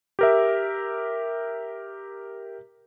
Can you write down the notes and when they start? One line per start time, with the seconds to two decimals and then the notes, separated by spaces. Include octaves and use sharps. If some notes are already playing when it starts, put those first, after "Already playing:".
0.19 G4 A#4 E5